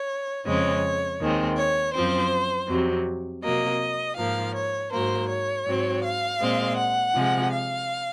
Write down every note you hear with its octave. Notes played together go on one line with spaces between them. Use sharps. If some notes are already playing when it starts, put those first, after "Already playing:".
Already playing: C#5
F2 C#3 G#3 C4 C#5
D#2 D#3 G#3 C4
C#5
F#2 F3 C4 C5
F2 C3 F#3
C3 F#3 A#3 D#5
G#2 F3 A#3 F5
C#5
G#2 F#3 A#3 C5
C#5
G#2 F#3 C4
F5
A#2 G#3 C4
F#5
C3 F3 G#3
F5